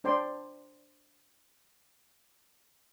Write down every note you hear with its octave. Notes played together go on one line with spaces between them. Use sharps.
D4 C5 D5 G5 C6